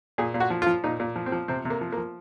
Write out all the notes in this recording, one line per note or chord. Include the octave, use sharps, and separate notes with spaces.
A#2 G#4
A#2
F#4
F3
F4
F3
A#2 D#4
A#2
F3
C4
F3
C3 C4
C3
A#3
F3
A#3
F3